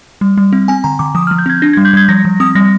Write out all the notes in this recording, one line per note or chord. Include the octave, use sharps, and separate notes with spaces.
G3
G3
C4
C4 G#5
D3 A#5
D3 D6
F3 D#6
F6
F3
G6
C4 G#6
D4 A#6
G#6
G3
G6
G3 G#6
F3 A#6
F3
C4 D#6
G3 A#6